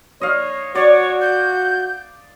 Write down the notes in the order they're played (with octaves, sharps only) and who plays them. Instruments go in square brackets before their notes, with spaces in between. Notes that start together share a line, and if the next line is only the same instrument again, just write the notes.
[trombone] C#5 [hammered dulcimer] D#5 F5
[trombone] F#4 [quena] C#5 [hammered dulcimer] D5
[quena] G6